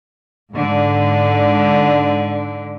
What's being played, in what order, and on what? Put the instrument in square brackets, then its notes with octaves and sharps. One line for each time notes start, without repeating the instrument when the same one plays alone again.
[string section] G#2 D3